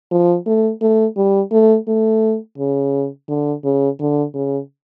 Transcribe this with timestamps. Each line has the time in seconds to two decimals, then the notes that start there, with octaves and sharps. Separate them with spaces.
0.12 F3
0.46 A3
0.81 A3
1.17 G3
1.52 A3
1.88 A3
2.58 C#3
3.29 D3
3.64 C#3
4.00 D3
4.34 C#3